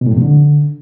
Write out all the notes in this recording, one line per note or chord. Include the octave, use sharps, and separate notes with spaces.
B2
A2
F2
C3
D3